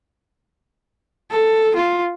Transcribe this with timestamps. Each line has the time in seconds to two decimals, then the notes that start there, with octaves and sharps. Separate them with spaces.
1.31 A4
1.76 F4